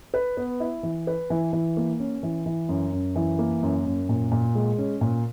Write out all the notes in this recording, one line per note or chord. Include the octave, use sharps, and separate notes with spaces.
B4
B3
E4
E3
B4
E3
E3
A#3
C#4
E3
E3
F#2
F#2
E3
A#3
F#2
F#2
A#2
A#2
G#3
C#4
A#2